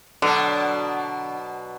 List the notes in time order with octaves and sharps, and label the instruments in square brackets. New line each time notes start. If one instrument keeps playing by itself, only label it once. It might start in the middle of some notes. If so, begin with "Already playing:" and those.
[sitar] B2 F#3 D4 [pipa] D3